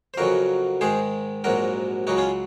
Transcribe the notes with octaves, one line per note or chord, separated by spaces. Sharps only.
C5
F2 C#3 F#3 F#4 A#4
G#2 D#3 G#3 G#4 C5
A#1 G#2 F#3 F#4 A#4
C#2 C#3 F#3 D#4 F#4
C#4 F4